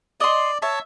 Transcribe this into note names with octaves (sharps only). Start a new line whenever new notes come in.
D5 D#5 C6
C#5 E5 A5